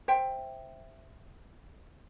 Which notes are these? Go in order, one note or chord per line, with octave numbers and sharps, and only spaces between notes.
C5 E5 G5